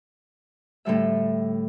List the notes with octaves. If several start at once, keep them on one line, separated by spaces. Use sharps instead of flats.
A2 D3 G3 E5